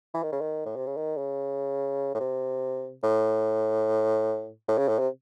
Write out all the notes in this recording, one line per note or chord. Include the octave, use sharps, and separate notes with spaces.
E3
D#3
C#3
D#3
A2
C3
C#3
D#3
C#3
A2
C3
A2
A2
C#3
A2
C3